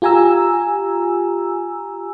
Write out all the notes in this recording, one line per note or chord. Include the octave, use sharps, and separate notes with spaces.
F4 G4 G#5 A#5 E6